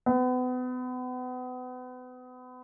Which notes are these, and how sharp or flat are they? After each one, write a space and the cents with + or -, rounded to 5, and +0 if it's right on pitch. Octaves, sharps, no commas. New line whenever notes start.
B3 +35